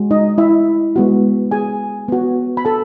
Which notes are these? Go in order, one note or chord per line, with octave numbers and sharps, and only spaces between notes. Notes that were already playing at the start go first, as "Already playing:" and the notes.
Already playing: G#3 F#4
D#4 D#5
E4 E5
G#3 B3 F#4
G#4 G#5
B3 F#4
B5
A4 A5